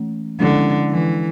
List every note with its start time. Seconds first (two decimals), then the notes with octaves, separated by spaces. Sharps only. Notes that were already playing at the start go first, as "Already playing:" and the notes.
Already playing: E3 A3 C#4
0.40 D3 F3 G#3 C#4 E4 A4
0.90 E3